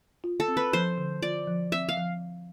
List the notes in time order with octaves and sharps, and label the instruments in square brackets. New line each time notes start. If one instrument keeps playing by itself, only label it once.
[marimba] F4
[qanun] A4
[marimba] C4
[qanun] B4
[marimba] F3 [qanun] C5
[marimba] D3
[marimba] F4 [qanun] D5
[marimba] F3
[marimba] C4 [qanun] E5
[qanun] F5
[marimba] F3